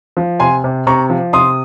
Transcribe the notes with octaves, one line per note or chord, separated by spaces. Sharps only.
F3
C3 G#5 C6
C3
C3 A#5 C#6
F3
C3 C6 D#6